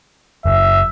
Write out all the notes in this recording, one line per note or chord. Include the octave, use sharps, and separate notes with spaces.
F#1 E5